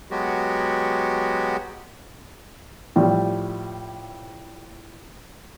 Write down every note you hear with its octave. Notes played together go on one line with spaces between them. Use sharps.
F#3 G#3 B3 F#4 G4
A2 F3 G3